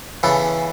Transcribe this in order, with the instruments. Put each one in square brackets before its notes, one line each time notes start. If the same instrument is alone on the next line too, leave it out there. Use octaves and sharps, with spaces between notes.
[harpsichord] C#3 E3 B3 A4